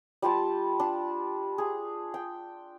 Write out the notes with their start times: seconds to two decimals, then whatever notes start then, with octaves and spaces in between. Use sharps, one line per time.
0.22 G3 F4 G4 A5
0.80 D4
1.58 G#4
2.14 G5